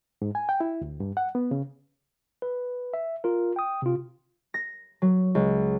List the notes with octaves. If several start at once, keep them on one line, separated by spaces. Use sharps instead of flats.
G#2
G#5
G5
E4
D2
G2
F#5
B3
C#3
B4
E5
F4 A#4
G5 D#6
C3 F4
A#6
F#3
C#2